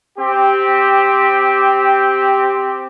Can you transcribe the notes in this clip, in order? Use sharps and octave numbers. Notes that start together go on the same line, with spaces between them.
C4 G4